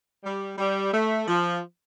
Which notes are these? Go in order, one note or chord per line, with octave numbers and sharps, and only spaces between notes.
G3
G3
A3
F3